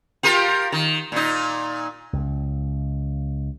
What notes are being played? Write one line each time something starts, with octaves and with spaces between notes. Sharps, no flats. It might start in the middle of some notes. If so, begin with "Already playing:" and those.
F4 G4 A#4
D#3
A#2 D#4
C#2